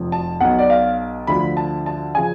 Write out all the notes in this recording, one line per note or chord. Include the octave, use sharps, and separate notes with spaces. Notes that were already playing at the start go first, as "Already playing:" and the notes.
Already playing: F1 F2 F3
A5
B1 B2 F#5
D5
F5
D2 D3 F3 B5
A5
A5
C#3 F3 G#5